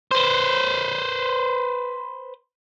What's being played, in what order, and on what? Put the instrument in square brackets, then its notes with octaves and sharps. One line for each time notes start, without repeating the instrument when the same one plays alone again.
[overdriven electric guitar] B4 C5